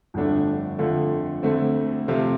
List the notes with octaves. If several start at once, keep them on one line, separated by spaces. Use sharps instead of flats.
G1 F2 D3 A3 D4
F2 D3 A3 F4
D2 D3 A3 C4
C3 F3 A3 F4